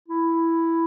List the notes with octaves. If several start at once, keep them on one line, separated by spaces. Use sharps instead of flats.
E4